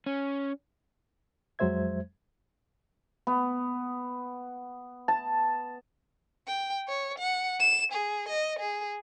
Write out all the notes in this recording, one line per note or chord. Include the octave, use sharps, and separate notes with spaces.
C#4
F2 F#3 G#3 C5 E5 G#6
B3
A5
G5
C#5
F#5
E7
G#4
D#5
G#4